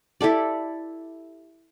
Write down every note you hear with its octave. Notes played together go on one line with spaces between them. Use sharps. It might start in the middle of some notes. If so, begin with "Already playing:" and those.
E4 G4 A4 D5